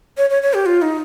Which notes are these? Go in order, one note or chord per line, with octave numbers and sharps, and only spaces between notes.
C#5
C#5
C#5
G4
F4
D#4